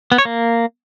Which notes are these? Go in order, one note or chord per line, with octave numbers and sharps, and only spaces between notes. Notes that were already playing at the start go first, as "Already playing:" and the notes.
B3
C#5
A#3